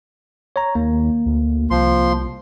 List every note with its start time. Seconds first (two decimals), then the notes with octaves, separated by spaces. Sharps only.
0.56 C#5 A#5
0.75 D#2 A#3
1.26 D2
1.71 C2 F3 C6